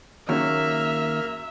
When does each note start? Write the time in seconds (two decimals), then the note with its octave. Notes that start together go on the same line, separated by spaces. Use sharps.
0.29 D#2 C#3 F#3 A#3 E5 F6